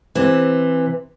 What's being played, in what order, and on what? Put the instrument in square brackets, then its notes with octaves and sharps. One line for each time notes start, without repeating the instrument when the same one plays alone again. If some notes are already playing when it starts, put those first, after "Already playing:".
[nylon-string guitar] C3 E3